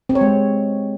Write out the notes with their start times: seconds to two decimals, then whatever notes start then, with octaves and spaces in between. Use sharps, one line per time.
0.09 C4
0.15 C#5
0.21 G#3